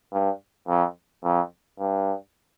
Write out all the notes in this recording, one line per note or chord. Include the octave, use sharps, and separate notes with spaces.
G2
F2
F2
G2